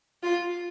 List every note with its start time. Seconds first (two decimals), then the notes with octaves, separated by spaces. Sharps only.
0.23 F4